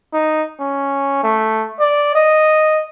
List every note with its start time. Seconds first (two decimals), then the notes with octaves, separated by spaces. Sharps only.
0.13 D#4
0.60 C#4
1.23 A3
1.79 D5
2.15 D#5